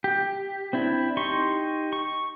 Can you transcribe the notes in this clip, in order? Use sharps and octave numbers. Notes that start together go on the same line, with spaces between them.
G4
C4 D4 E4
D#4 G4 C6 C#6
C#6